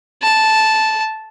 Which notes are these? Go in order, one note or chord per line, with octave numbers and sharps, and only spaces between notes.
A5